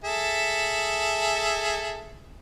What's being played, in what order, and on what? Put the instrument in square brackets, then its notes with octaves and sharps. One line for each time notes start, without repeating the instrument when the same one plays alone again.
[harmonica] G#4 A4 E5